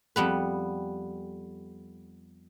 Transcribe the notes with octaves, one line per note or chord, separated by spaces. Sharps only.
F2 G3 B3 B4